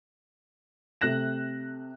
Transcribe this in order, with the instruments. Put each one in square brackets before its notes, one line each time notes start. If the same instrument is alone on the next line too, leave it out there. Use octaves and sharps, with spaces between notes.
[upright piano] C3 A3 F#6 A#6 E7